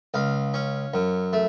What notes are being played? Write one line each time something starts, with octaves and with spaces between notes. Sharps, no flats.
C#2 F5
C#4
F#2
A3